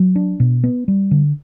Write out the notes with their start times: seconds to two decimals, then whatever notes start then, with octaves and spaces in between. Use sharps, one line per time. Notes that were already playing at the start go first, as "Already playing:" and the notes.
Already playing: F#3
0.16 D4
0.40 B2
0.64 B3
0.88 G3
1.11 D3